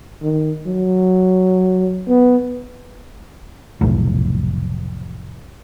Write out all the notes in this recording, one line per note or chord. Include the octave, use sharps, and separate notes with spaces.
D#3
F#3
B3
F1 B1 A2